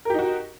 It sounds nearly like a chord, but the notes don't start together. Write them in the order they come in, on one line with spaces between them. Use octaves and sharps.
A#4 G4 D#4 F#4